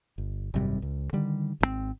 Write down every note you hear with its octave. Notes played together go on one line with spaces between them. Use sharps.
G1
G#1 F#2 C3 G3
C#2
D3 D#3 G3
G#1 C#3 C4